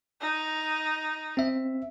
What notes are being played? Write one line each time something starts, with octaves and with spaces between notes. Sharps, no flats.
D#4
C4 E5